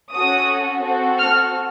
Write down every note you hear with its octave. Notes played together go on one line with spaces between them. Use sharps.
C#4 F#4 A4 D#6
C4 F#4 A4
F6